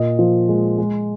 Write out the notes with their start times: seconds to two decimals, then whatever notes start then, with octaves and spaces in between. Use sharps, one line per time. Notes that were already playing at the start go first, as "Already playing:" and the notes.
Already playing: A#2 D#5
0.19 F3
0.49 G#3
0.78 G#3